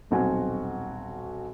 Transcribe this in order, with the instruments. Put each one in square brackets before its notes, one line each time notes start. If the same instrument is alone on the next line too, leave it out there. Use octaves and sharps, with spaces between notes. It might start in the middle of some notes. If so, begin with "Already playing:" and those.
[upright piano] D#1 B1 C4 F#4 G#5